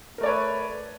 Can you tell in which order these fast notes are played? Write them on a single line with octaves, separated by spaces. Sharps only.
A#4 A3 D5 C#5 B4